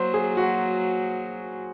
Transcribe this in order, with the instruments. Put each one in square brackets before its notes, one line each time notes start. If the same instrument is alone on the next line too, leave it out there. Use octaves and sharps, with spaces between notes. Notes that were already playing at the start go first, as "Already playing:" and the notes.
Already playing: [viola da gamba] F#3 A#3 [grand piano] C5
[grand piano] G#4
F#4